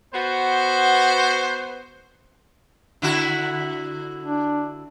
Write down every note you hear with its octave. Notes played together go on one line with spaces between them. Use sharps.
B3 F#4 C5
D3 E4 F#4
D4